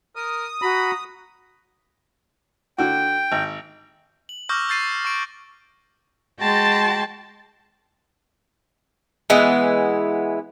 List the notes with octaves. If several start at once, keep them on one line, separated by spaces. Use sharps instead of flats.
A#4 D#6
F#4 A#5 B5
D3 F#4 G5
G#1
F#7
C#6 D6 E6 F6 G6 A#6
E6 G6 A6 C7 D#7
C#6 F6 D7
G#3 F#4 G5 A5 C6 A6
E3 G#3 B3